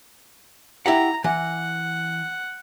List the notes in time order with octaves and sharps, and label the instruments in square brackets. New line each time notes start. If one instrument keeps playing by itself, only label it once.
[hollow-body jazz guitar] E4 G4 F#5 [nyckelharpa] A#5
[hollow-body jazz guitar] E3 [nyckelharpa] F#5